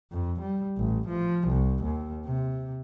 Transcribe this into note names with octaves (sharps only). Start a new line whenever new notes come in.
F2
G3
A1
F3
C2
D#2
C3